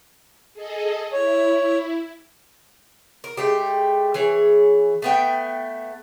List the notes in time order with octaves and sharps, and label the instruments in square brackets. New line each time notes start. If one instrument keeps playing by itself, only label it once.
[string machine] G#4 A4 D#5
[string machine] E4 [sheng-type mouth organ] C#5
[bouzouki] A#4
G#3 A3 G4
E3 G#4 C#5
A3 B3 G5